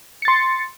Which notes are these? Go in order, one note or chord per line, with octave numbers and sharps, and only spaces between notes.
C6 A6 C#7